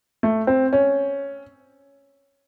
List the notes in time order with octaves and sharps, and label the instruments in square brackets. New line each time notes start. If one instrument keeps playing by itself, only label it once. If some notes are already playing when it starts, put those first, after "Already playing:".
[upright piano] A3
C4
C#4